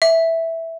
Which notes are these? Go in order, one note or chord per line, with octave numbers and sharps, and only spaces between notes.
E5